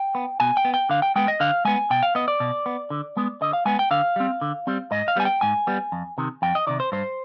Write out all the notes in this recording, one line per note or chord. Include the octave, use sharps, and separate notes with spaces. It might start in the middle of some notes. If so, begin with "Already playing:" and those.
Already playing: G5
B3
B2 G#5
G5
B3
G5
D3 F5
G5
G#3 B3 G5
D#5
D3 F5
G#3 B3 G#5
B2 G5
F5
B3 D#5
D5
B2
B3
D3
G#3 B3
D3 D#5
F5
G#3 B3 G#5
G5
D3 F5
G3 C4
D3
G3 C4
G#2 D#5
F5
G3 B3 G#5
G5
G#2 G#5
G3 B3
F2
C3 D#3
F2 G5
D#5
C3 D#3 D5
C5
G2 C5